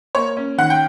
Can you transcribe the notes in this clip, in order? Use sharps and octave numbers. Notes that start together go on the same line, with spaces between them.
A#3 C#5
C#4
D#3 F#5
G5